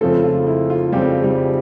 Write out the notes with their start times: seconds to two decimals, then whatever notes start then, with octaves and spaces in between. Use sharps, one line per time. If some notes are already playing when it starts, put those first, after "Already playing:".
0.01 F2 C#3 F3 G#3 A3 C4 A4
0.24 F4
0.47 E4
0.70 F4
0.92 F2 C#3 F3 G3 G#3 C4 G4
1.23 G3 G4